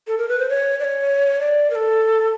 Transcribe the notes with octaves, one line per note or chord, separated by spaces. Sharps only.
A4
A#4
B4
C5
C#5
D5
C#5
D5
A#4
A4